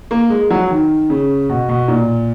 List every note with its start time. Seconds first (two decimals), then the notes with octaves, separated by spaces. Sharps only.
0.11 A#3
0.30 G#3
0.50 F#3
0.70 D#3
1.10 C#3
1.49 B2
1.69 B2
1.88 A#2